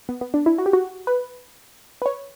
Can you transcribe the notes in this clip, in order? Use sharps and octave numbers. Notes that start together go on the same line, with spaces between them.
B3
B3
D4
E4
F#4
G4
F#4
B4
B4
C#5